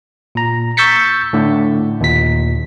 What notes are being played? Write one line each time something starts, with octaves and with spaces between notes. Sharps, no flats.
A#2 A#5
C#6 E6 G6 A6 B6 C#7
A2 D3 A3
D#2 A#2 B6